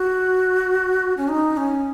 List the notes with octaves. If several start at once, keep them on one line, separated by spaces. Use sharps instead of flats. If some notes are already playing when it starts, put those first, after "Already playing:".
Already playing: F#4
C#4
D#4
C#4